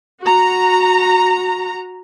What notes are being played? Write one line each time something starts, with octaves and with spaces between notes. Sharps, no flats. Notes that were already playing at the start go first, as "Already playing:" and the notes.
F#4 A#5